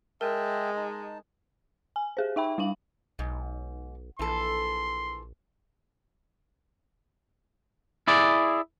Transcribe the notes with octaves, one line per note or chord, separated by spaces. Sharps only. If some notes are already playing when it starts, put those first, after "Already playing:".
G#3 A#4 E5 G5 A5
D#4 A5
G#5
G4 G#4 C5
D#4 E5 G5 B5
G3 D4 F5 F#7
B1 G#2
A#1 E3 A4 C6
E4 G#4 D5